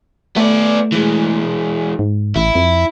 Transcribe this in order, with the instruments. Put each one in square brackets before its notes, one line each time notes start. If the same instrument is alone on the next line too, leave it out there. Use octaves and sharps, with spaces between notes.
[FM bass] A3 [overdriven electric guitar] B3 D5
[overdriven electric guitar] E3 G#3
[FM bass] G#2
[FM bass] A1 [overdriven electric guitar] E4
[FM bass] F2